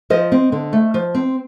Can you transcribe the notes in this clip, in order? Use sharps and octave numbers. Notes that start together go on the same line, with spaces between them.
F3 C5 D#5
C4
D3
A3
F3
C4